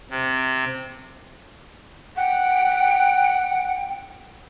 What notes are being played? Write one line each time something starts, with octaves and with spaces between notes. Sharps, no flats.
C3
F#5 G5